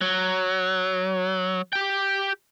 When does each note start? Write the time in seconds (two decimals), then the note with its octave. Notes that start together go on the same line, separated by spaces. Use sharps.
0.01 F#3
1.73 G4 G5